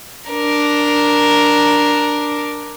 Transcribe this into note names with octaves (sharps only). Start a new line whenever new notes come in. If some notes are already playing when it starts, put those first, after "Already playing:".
D4 A#4